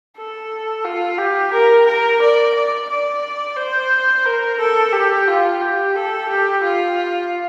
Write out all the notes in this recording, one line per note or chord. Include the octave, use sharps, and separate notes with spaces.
A4
F4
G4
A#4
A#4
D5
D5
D5
C5
A#4
A4
G4
F4
G4
A4
G4
F4